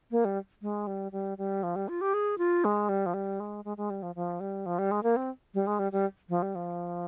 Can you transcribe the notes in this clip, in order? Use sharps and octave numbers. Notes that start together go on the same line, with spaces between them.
A#3
G3
G#3
G3
G3
G3
F3
G3
F4
G4
G#4
F4
G#3
G3
F3
G3
G#3
G#3
G#3
G3
F3
F3
G3
F3
G3
G#3
A#3
C4
G3
G#3
G3
G3
F3
G3
F3